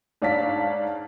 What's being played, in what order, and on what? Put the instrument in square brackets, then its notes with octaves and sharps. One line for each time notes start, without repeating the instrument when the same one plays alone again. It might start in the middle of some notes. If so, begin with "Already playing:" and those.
[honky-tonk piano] G#2 D4 C#5 F5 A5 B6